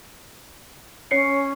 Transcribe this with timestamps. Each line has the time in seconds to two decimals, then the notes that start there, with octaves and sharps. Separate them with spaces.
1.11 C#4 C#5 C7 C#7